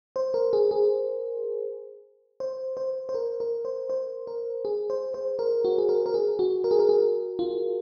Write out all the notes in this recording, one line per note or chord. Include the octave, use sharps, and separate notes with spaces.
C5
A#4
G#4
G#4
C5
C5
C5
A#4
A#4
C5
C5
A#4
G#4
C5
C5
A#4
F#4
G#4
A#4
A#4
G#4
F#4
A#4
G#4
A#4
G#4
F4